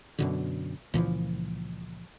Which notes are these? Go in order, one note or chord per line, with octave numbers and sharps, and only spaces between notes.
F#2 B2 D3
C#2 A#2 E3 F3